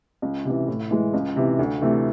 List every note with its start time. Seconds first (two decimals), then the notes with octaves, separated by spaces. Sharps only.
0.22 C#2
0.45 C3 E3
0.68 A2
0.91 E3 G#3
1.14 C#2
1.36 C3 E3
1.59 D2
1.81 C3 E3 A3